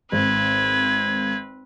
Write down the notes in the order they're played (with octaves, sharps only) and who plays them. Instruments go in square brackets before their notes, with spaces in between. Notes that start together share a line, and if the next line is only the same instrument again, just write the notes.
[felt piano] G#1 [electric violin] C4 B4 [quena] G#6